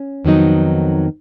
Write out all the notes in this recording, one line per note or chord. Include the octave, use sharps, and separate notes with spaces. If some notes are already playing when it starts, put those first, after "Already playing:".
Already playing: C#4
F2 D#3 F#3 B3 D#4